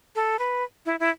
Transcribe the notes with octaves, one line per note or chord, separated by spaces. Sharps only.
A4
B4
E4
E4